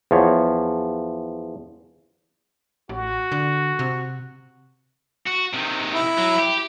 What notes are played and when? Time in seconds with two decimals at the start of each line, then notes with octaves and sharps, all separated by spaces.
0.11 E2 F3 C#5
2.89 A1 F#4
3.32 D3
3.79 C3
5.26 F#4
5.53 C3 D#3
5.93 E4
6.18 F#3
6.39 G4